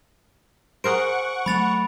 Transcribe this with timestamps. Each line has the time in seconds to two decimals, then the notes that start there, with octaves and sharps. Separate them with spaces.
0.84 G#4 A#4 C5 F#5 C#6 D7
1.46 F#3 G#3 A3 B5 A6 F7